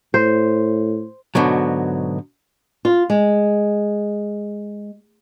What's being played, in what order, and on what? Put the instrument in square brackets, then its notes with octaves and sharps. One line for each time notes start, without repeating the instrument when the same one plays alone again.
[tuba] A2 [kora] C5
[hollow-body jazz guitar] G#2 B2 D3 F#3
[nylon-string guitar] F4
G#3